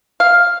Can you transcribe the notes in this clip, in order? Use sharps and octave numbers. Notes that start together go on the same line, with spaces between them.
F5